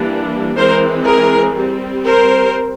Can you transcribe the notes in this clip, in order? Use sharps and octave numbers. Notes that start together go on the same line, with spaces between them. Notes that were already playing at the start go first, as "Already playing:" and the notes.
Already playing: E3 G3 A#3 D4
E3 G#3 C4 A#4 C5
G#4 A#4
G3 C4
A#4 C5